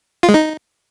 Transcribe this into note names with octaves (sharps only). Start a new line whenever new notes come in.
F4
G#3
D#4